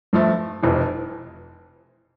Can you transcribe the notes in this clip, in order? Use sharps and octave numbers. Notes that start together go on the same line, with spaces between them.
G2 F3 A3
F1 F2 E3